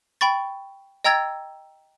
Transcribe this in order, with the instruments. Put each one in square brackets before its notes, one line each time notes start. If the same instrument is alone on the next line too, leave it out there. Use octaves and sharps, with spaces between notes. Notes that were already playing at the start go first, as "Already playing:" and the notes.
[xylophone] G5 B5 C#6 A6
D#5 G5 A#5 E6 G#6 A6